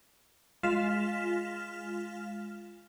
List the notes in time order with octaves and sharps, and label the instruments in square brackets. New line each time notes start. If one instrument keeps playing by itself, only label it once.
[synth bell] G#3 F4 F5 F6 B6 E7